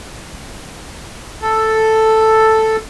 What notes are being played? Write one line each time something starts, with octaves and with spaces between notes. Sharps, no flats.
A4